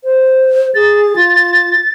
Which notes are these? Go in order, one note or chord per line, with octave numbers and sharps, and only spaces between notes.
C5
G#4 A6
F4